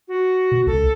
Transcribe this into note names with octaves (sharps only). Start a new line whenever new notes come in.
F#4
B2
C#2 A4